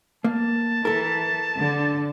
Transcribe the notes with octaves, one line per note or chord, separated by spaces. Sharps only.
A#3 A5
E3 A4 A#4
D3